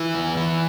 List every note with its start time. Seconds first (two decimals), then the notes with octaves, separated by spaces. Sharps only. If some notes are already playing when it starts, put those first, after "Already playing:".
Already playing: E3 E4
0.14 E2
0.37 E3